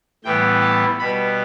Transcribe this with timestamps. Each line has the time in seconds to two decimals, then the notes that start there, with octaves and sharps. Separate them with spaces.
0.24 A2 E3 G3 B3 G5
0.61 A5
0.99 B2 G3 B3 B5